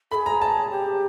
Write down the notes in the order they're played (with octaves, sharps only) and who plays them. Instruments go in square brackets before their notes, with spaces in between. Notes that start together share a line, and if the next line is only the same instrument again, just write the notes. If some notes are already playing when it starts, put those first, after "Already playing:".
[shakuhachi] G#4 A4 [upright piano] B5
[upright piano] A#5
A5
[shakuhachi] G4